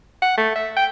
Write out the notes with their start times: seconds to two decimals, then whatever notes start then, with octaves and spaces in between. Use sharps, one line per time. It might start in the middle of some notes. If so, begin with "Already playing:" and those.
0.22 F#5
0.37 A3
0.56 E5
0.77 G5